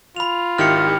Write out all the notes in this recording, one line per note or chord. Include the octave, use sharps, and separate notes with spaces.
F4 B5 F7
G#1 D#3 E4 G4 F6 C#7